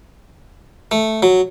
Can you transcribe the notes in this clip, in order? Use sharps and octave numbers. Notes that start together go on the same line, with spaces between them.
A3
F#3